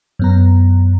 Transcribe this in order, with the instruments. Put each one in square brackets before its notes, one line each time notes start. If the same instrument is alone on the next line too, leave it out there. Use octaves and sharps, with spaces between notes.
[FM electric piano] F#2 B3 A#5